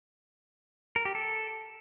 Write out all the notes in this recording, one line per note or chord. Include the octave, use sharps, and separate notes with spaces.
A#4
G4
A4